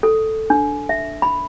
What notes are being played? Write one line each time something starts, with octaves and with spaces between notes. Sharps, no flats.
A4
D4
E5
B5